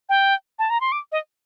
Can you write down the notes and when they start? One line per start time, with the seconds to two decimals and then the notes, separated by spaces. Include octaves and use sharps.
0.09 G5
0.59 A5
0.70 A#5
0.81 C6
0.92 D6
1.12 D#5